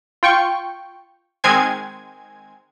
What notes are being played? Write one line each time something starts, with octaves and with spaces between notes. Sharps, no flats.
F4 G5 C#6
D#3 G#3 C4 G#5 G#6